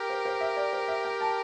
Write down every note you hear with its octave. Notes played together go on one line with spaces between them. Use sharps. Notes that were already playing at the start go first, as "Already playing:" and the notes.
Already playing: G4 A#4
C5
C5
E5
D5
C5
E5
G5
A5